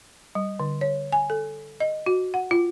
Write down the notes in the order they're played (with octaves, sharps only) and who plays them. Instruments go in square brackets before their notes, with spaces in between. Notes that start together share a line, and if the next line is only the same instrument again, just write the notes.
[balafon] G3
D3
C#5
G#5
A4
D#5
F#4
F#5
F4